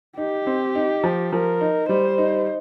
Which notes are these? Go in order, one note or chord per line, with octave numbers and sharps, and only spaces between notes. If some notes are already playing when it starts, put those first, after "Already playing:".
D#4 G4
C4
D#4
F3
F3 A#4
D#4
G3 C5
D#4